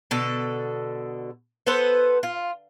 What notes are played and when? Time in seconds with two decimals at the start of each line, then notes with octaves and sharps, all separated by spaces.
0.11 B2 D3 A4
1.67 B3 A4 B4 C5
2.23 F4